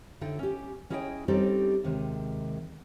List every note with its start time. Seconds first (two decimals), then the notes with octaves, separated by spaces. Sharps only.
0.21 D3 D#4 A4 E5 G5
0.39 C#4 G4
0.90 C#4 E4 G#4 D#5 F5 G5
1.28 G3 C4 C#4 D#4 G4 A4
1.84 D#2 C3 D#3 G#3